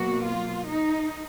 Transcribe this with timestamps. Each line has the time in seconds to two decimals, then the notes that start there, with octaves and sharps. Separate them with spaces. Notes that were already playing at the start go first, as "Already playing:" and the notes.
Already playing: B2 F#3 A#3 F#4
0.26 F4
0.68 D#4